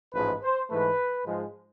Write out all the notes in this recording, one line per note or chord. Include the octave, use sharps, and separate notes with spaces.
A1 G#2 F3 G#3 B4
C5
G#2 E3 A3 B4
G#2 F3 G#3